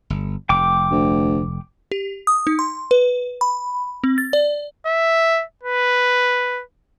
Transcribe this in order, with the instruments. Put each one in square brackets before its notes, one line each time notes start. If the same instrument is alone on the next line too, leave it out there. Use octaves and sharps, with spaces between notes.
[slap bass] G1
[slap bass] F1 [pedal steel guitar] G5 D6
[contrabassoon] D2
[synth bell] G4
D#6
D#4
C6
B4
B5
C4
A6
D5
[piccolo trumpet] E5
B4